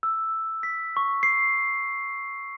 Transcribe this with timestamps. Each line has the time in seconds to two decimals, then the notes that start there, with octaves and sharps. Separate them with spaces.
0.03 E6
0.63 B6
0.97 C#6
1.23 C7